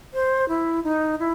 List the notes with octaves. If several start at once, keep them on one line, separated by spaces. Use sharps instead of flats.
C5
E4
D#4
E4